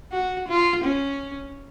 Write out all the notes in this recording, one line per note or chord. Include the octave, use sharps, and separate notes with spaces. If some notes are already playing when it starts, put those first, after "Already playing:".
F#4
F4
C#4